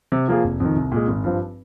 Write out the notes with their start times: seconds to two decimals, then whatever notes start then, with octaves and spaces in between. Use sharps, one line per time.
0.12 C3
0.28 F3 A#3 F4 G#4
0.44 F1
0.60 F2 D#3
0.76 C2
0.92 A#2 G#3
1.07 G#1
1.24 G2 F3 C4